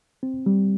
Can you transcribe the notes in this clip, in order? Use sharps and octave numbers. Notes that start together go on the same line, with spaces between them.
C4
G3